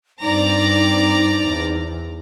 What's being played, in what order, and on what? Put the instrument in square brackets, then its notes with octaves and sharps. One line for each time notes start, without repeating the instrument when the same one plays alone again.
[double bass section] G2 [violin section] C4 D5 A#5 [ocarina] D#4
[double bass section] E2